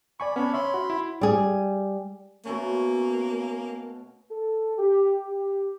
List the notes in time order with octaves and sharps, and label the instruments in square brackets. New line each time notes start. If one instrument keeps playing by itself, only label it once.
[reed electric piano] D5 G#5 C#6 [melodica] B5
[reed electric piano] B3 [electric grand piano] C#4 [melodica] D4 C#5 B5
[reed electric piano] C#5 E5 [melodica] B5 C6
[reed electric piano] F#4
[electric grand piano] E4
[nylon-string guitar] G3 G#4
[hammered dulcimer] B2 A3 C#4 [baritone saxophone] A#3
[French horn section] A4
G4
G4